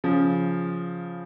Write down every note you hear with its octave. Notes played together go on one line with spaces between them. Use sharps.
C#3 F3